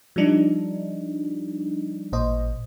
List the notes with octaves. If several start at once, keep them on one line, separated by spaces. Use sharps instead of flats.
F3 G3 D4 D#4
A1 A#2 C5 D#5